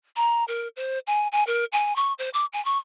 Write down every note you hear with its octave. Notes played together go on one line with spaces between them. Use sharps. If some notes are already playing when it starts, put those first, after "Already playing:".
A#5
A#4
C5
G#5
G#5
A#4
G#5
C#6
C5
D6
G#5
C#6